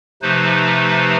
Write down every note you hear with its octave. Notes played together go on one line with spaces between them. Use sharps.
C3 F3 A3 D#4 B4 C5